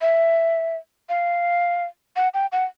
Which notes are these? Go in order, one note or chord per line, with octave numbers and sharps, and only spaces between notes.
E5
F5
F#5
G5
F#5